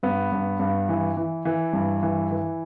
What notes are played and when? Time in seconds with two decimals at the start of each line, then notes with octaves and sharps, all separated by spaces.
0.03 G2 B3
0.32 G2
0.60 G2
0.89 E3
1.17 E3
1.45 E3
1.73 G2
2.03 E3
2.31 E3